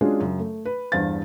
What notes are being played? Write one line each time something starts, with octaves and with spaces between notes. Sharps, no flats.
G#3 C#4 D4 F4 F#4 G#4
F#2 C#3
A3
B4
E2 G2 C5 F5 A6